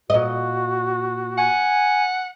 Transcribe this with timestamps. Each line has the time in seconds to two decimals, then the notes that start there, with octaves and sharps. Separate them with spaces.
0.10 A#2 F#4 D#5
1.38 F#5 G#5